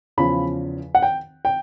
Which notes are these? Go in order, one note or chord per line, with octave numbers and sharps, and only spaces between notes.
E2 C#3 F3 B5
F#5
G5
G5